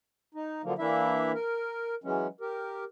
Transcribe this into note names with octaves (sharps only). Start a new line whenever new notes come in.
D#4
D3 F3 F#3 A#3
E3 A#3 D4 E4 E5
A#4
E3 F#3 G#3 C#4
G4 A#4